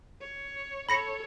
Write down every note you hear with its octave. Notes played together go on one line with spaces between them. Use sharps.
C#5
A4 C#5 B5 A#6 C#7